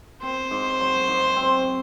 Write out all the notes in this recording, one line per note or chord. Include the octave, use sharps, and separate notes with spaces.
C4 C5
G#2
F#3
G#2
C4